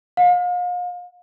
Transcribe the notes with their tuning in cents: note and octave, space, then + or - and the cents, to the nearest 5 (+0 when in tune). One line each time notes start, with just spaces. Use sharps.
F5 +40